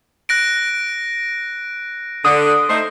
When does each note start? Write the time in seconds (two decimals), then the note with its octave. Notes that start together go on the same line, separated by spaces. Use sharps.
0.29 F#6 A#6 D7
2.25 D3 D#6
2.70 A3 D#4 C5